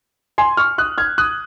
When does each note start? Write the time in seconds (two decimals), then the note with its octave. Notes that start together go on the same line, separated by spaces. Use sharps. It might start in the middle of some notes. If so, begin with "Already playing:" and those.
0.38 G#5 C6
0.57 C#6 F6
0.78 D#6 F#6
0.98 F6 G#6
1.18 D#6 F#6